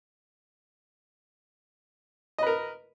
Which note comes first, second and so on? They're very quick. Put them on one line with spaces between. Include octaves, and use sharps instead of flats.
D#5 B4 A#4